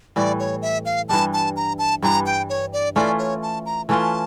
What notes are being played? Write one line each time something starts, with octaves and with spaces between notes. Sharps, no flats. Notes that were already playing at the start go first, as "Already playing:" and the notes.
A2 E3 G3 D5
C#5
E5
F5
G2 E3 G3 D4 A5
A5
A#5
A5
G2 E3 G3 D4 A#5
G5
C#5
D5
E3 A3 C#4 F4 D5
C#5
A5
A#5
E3 A3 C#4 F4 A5